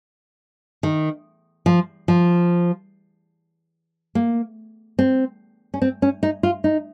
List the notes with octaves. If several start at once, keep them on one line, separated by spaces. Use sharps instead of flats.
D#3
F3
F3
A#3
C4
C#4
C4
C#4
D#4
F4
D#4